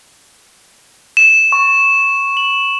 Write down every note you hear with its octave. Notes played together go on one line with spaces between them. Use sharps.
E7
C#6
F#7